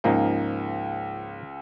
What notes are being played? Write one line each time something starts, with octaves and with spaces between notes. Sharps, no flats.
C#2 G#2 C#3 F3 A#3 D#4